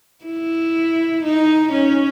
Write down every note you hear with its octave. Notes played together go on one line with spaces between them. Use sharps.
E4
D#4
C#4